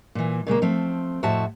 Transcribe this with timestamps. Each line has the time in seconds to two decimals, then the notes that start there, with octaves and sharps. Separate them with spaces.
0.15 A#2 E3
0.47 A#2 C#3 G#3 A#3
0.62 F3 A3 C4
1.23 F2 A2 F#4 C5 E5 A5